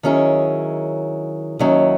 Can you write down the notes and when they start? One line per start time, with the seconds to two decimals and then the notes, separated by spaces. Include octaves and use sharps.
0.03 D#3 F#3 C#4 E4 G#4
1.59 D#2 D#3 F#3 C#4 E4